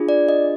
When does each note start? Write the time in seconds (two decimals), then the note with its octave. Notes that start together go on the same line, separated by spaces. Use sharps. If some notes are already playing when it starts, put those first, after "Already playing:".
Already playing: D4 F4 G#4
0.09 D5
0.29 D#5